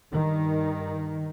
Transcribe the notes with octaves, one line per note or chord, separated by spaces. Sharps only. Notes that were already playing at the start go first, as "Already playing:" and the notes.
G2 D#3